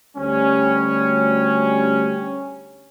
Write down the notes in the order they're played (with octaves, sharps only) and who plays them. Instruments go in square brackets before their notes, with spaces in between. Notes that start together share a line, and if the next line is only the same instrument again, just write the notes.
[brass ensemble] D2 G3 C#4